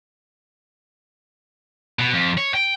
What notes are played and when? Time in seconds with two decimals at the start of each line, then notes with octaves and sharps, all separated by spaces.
1.99 B2
2.14 F2
2.38 C#5
2.54 G5